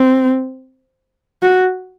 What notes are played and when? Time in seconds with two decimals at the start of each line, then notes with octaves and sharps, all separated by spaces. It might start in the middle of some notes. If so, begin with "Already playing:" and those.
Already playing: C4
1.42 F#4